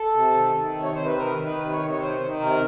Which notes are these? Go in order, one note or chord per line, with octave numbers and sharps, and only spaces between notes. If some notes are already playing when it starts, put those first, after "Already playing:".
Already playing: A4
C3
D#3
D#3
C3
C#5
C3 C5
B4
D#3 A#4
D#3
B4
C3
C#5
C3
C#5
D#3 C5
D#3
C3 A#4